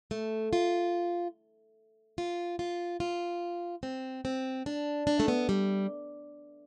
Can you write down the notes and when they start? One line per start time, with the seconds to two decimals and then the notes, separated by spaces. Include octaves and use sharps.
0.11 A3
0.53 F4
2.18 F4
2.59 F4
3.00 F4
3.83 C4
4.25 C4
4.66 D4
5.07 D4
5.20 A3
5.28 B3
5.49 G3